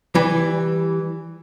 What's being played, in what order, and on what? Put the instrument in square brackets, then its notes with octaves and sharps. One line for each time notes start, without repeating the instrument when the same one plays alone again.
[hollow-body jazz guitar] E3 G3